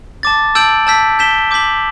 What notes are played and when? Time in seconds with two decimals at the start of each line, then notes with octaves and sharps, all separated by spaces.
0.23 A5 D6 A6
0.55 A5 E6 G6 D7 F#7
0.87 A5 E6 G6 B6
1.19 G6 B6 E7 G7
1.51 D6 G6 B6 F#7